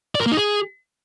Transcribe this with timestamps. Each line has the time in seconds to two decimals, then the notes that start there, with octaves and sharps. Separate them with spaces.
0.15 D5
0.21 A#4
0.26 A#3
0.32 D#4
0.37 G#4